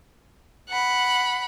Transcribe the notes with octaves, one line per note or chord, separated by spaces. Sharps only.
F#5 B5